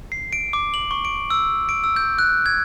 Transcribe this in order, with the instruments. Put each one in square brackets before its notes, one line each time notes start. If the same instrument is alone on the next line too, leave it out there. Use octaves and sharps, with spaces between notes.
[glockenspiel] C7
D7
D6
F#7
C#6
D7
E6
D7
E6
G6
F#6
G#6